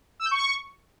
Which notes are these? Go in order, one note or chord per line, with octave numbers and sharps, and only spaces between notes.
E6
G6
C#6